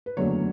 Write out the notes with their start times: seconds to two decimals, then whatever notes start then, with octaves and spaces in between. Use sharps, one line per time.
0.06 B4
0.17 F#1 E2 D3 F#3 A3 C#5